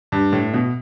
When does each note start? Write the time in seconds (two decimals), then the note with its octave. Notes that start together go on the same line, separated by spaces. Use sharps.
0.12 G2
0.33 A2
0.53 B2